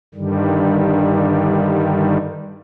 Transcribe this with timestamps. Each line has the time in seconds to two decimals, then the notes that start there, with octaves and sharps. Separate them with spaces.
0.15 G2 D3 D#3 G3